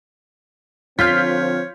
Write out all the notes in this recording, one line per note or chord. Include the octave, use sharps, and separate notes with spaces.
D3 F3 C4 F4 C#5 F6 G6 B6